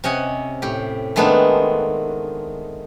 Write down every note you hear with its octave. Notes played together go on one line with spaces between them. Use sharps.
C3 C#4 D#5 F#5 G#5
A2 G4
D#3 G#3 A3 B3 C4 D4